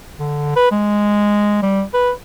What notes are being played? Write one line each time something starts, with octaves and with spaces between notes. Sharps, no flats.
D3
B4
G#3
G3
B4